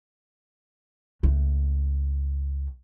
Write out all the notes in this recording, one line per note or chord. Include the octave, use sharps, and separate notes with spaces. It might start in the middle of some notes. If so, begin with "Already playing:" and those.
C#2 A3